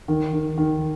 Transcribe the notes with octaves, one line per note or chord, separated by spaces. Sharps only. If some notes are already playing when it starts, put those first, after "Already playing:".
D#3
D#3
D#3